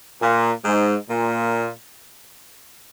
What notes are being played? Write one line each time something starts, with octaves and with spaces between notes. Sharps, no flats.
A#2
G#2
A#2